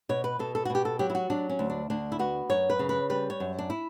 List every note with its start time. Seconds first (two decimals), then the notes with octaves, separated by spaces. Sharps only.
0.09 B2 C#5
0.24 B4
0.39 B2 A4
0.55 A4
0.65 F#4
0.70 B2
0.75 G4
0.85 A4
0.99 F#3 G4
1.10 E4
1.15 F#4
1.30 F#3 D4
1.50 C#4
1.59 D2
1.70 D4
1.90 D2 D4
2.12 E4
2.19 B3 F#4
2.50 F#2 C#5
2.70 B4
2.79 C#3
2.89 B4
3.10 G3 B4
3.30 C#5
3.40 F#2
3.59 D4
3.70 E4